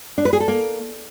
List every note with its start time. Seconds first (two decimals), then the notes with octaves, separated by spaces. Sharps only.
0.18 D4
0.25 B4
0.33 G#4
0.40 A4
0.48 A#3